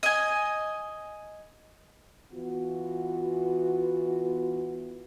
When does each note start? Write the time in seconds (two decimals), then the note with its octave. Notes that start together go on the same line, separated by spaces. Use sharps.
0.03 D#5 G#5
2.33 E3 B3 F4 F#4